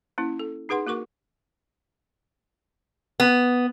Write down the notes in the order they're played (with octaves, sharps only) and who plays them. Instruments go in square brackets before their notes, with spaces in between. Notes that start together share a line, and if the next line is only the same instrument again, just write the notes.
[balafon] A#3 C#4 E4
A4
D#4 G#4 B4 F#5 C6
A#3 F#4 A#4 C#6 D6
[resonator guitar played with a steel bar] B3